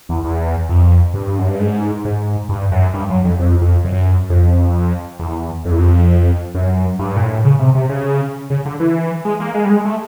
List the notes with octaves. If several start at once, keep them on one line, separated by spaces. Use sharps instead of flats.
E2
E2
F2
G2
F#2
G2
G#2
G#2
G2
F#2
G2
F#2
F2
F2
F2
F#2
F2
E2
F2
E2
F2
F#2
G2
A#2
A2
C#3
C3
C3
C#3
C#3
D3
E3
G#3
A#3
G#3
G3
G#3
A3